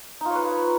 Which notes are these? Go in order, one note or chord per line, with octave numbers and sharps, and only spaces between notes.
D#4 F4 B4 C#5